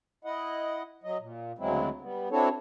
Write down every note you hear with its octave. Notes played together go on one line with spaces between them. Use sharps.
E4 D#5 F#5
F#3 D#5
A#2
D2 C#3 F#3 G#3 C4 E4
G3 B3
C4 D4 E4 F#4 A4 C#5